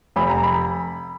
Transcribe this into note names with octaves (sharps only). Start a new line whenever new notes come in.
F1 B5
A#5
B5